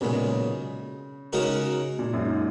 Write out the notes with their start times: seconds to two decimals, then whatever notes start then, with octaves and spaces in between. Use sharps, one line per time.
0.01 B1 A#2 C#3 G#3
1.33 C#3 G#3 D#4 F#4 A#4
1.99 A#2
2.13 F#2
2.21 G#2